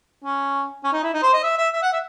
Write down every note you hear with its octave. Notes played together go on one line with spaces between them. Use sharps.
C#4
C#4
D#4
E4
D#4
C5
D#5
E5
E5
E5
F#5
E5